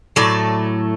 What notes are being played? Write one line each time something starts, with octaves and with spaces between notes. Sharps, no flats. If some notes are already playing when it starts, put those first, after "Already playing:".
A2 F#3 A3 D5